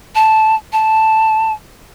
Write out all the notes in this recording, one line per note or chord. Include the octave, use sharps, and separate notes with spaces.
A5
A5